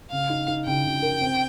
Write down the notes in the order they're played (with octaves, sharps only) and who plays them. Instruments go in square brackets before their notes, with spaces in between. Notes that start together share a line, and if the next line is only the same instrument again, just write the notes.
[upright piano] C#3 [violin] F5
[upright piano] D#4
D#4
[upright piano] C#3 [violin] G5
[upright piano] C#3
A#4
C4